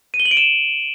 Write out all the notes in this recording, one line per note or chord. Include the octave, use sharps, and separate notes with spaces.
D#7
G7
F#7
D7
E7